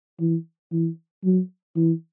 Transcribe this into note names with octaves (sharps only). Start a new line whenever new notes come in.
E3
E3
F#3
E3